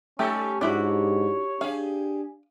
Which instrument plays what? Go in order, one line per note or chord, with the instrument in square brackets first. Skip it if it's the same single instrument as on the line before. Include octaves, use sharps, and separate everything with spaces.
[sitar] G3 D#4 A4 [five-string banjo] A3 G4 [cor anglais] C#4
[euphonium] G#2 [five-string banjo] D4 E4 F#4 [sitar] G4 [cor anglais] C#5
[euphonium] D4 [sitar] G4 G#4 [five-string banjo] F5